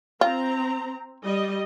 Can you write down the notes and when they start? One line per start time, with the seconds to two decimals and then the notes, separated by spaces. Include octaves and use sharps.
0.21 C4 F4 A#5
1.24 G3 D#5